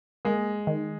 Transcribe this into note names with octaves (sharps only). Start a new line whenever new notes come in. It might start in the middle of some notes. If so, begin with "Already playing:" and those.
G#3 A#3
D#3